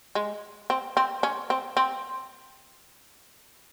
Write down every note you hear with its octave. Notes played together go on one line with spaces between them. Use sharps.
G#3
C4
C4
C#4
C4
C4